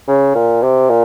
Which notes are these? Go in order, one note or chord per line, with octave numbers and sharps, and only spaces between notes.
C#3
A#2
C3
A#2